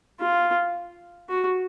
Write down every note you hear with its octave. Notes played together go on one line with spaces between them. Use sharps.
F4
F#4